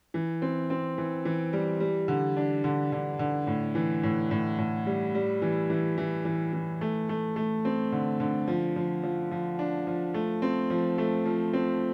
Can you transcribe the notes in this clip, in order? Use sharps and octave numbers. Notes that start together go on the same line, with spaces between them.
E3
C4
C4
E3
E3
G3
G3
D3
D4
D3
D3
D3
A2
E3
A2
A2
A2
G3
G3
E3
E3
E3
E3
E3
A3
A3
A3
C4
D3
D3
F3
F3
F3
F3
D4
F3
A3
C4
F3
A3
F3
C4